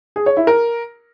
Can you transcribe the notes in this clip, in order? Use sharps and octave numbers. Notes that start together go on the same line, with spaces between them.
G#4
C#5
E4
A#4